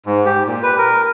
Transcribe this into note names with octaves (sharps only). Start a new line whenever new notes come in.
G#2
G4
A#2
B4
A#4